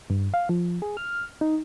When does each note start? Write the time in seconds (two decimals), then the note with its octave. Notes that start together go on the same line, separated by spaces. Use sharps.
0.10 G2
0.34 F5
0.49 F3
0.82 G#4
0.97 F6
1.41 D#4